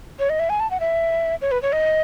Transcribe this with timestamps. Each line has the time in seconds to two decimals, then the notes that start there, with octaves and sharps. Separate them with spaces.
0.19 C#5
0.30 D#5
0.40 E5
0.50 G#5
0.60 A5
0.71 F#5
0.80 E5
1.42 C#5
1.51 B4
1.62 C#5
1.73 D#5